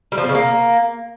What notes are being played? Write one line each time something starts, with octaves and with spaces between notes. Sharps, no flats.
G3
F3
C4
C#3
A#3